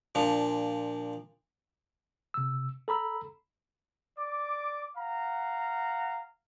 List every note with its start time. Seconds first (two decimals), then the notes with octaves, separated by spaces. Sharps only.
0.15 A#2 F3 D4
2.34 C3 E6
2.88 A4 A#5 B5 E6
4.18 D5 D6
4.96 F5 F#5 A#5